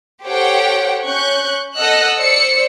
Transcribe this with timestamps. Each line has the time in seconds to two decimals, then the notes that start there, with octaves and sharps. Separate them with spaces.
0.23 G4 A4 C5 C#5 F#5 G5
1.04 C#4 C#6 F#6 G6
1.75 A4 D#5 F#5 E6 F#6
2.18 C5 D5 E6 C#7